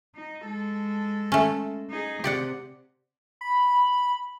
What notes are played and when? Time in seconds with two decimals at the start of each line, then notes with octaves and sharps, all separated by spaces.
0.15 D#4
0.45 G#3 A4
1.32 A3 C#4
1.90 D#4 G#4
2.24 C3 G4 D5 F#5
3.41 B5